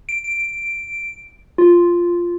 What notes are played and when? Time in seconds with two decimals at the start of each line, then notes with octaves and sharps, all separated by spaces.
0.09 D7
0.24 D7
1.58 F4